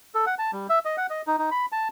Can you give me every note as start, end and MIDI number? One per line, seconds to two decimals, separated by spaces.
0.15 0.25 69
0.26 0.35 78
0.39 0.51 81
0.53 0.67 55
0.69 0.79 76
0.85 0.96 75
0.97 1.07 78
1.10 1.22 75
1.27 1.36 63
1.39 1.50 63
1.51 1.66 83
1.72 1.88 81